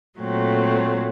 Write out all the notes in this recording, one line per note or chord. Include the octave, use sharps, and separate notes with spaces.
A#2 F#3 A3 C4